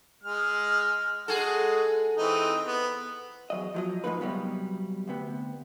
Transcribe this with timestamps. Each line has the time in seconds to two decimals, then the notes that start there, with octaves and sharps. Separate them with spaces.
0.23 G#3 F6
1.28 G#3 F#4 G#4 A4
2.17 E3 C4 D#4
2.66 B3
3.50 E2 F#3 D#5
3.74 F3 F#3 D#5
4.04 G#2 F3 G#3 A#3 D#4 B4
4.21 C3 F#3 G3 B3
5.08 D2 C3 B3